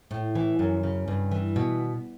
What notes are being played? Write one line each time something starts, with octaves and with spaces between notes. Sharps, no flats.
A2
E3
F#2
C#3
G2
E3
B2